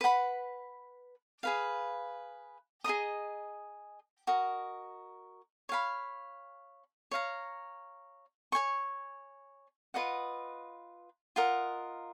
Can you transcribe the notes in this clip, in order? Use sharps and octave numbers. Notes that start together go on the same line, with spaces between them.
B4 F#5 B5
G#4 B4 F5
G#4 D#5 A#5 D#6
F#4 A#4 D#5
C#5 F5 B5
C#5 F5 A#5
C#5 G#5 C#6
F4 B4 D#5 F#5
F4 A#4 D#5 F#5